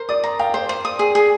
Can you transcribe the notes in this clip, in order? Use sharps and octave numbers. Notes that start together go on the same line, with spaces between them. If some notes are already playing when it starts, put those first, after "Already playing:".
Already playing: A#4 C5
D5 D#6
A#5
F5 G5
C5
C5
D#6
G#4
G#4